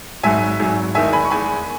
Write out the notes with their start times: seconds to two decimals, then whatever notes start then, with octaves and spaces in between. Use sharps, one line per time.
0.24 G#1 G#2 F#3 E5 G#5
0.60 G#1 G#2 F#3
0.95 E2 D#3 G#3 E5 G#5
1.13 G#5 B5
1.25 C#6
1.30 E2 D#3 G#3 G#5 B5